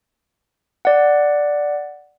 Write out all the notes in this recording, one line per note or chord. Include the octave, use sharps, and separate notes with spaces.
D5 F#5